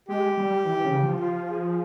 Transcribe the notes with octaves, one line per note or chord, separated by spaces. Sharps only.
G#3 G4
G3
E3
E3
C#3
F3
F4
G#4